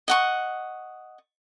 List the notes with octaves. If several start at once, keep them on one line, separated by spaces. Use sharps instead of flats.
D#5 F#5 C#6